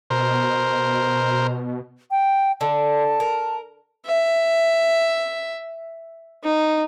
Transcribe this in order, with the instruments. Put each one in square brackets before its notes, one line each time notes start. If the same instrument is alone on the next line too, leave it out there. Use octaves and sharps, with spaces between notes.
[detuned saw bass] B2 [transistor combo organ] A#4 C5
[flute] G5
[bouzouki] D3 [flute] A5
[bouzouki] A#4
[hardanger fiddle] E5
D#4